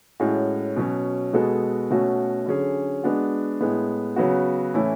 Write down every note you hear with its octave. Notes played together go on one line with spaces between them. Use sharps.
A2 G#3 C#4 F#4
B2 F#3 C#4
B2 G#3 B3 F#4 A4
B2 A3 C#4 F#4
D3 F#3 C#4 G#4
G#3 B3 D4 F#4
A2 G#3 B3
C#3 F#3 B3 F#4
A2 E3 A3 C#4 E4